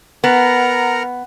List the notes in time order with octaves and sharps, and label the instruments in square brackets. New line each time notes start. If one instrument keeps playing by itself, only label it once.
[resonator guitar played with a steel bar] B3 [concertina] A#4 F#5 A#5